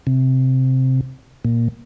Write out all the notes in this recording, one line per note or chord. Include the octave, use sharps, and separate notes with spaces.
C3
A#2